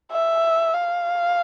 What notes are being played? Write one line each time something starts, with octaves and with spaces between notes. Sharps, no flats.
E5
F5